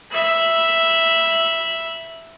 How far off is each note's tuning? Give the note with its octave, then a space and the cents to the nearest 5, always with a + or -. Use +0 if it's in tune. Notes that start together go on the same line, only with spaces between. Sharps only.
E5 +0 B5 -20